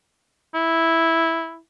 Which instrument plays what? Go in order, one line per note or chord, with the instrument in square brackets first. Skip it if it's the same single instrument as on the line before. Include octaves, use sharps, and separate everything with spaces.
[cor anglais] E4